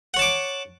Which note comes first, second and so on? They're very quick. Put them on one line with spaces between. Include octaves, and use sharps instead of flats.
F#5 C#5 A5 D6